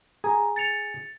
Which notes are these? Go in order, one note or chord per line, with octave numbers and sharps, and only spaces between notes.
G#4 A#5
A6 C#7 F7